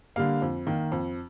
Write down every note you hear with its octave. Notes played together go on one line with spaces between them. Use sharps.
D3 G3 A#3 F5
F2
D#3 A#3
F2